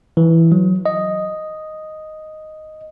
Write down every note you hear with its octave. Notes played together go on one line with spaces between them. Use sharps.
E3
F#3
D#5